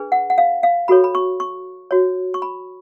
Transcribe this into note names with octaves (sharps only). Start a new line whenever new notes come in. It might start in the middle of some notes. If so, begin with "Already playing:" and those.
Already playing: D4 G#4 B4
F#5
F#5
F5
F5
F#4 A4 C#5 B5
B5
C#6
C#6
F#4 C#5
C#6
B5